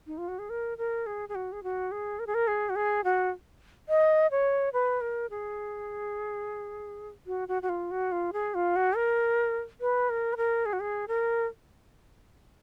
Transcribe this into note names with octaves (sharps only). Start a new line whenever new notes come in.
D#4
F4
F#4
G#4
A#4
A#4
G#4
G#4
F#4
G#4
F#4
G#4
A#4
G#4
A#4
G#4
F#4
G#4
F#4
D#5
C#5
B4
A#4
G#4
F#4
F#4
F#4
F4
F#4
F4
G#4
F4
F#4
A#4
B4
A#4
B4
A#4
G#4
F#4
G#4
A#4